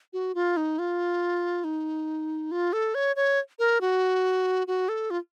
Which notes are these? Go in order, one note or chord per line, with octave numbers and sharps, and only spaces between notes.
F#4
F4
D#4
F4
D#4
F4
A4
C#5
C#5
A#4
F#4
F#4
A4
F4